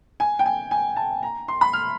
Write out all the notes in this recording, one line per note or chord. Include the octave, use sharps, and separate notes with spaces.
G#5
G5
G#5
G#5
A5
A#5
C6
B5
F6